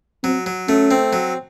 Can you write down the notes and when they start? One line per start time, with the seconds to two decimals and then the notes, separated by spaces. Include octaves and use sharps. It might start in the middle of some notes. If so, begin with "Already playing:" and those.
0.23 F#3 C4
0.46 F#3
0.68 A3 C#4
0.91 C4
1.13 F#3